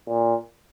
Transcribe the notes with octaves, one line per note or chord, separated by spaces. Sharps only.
A#2